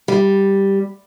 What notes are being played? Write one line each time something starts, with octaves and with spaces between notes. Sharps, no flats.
G3